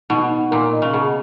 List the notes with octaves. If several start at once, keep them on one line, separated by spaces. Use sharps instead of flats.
B2 D#4
D#4
A#2 A#4
D#5
C#3
B2 G#4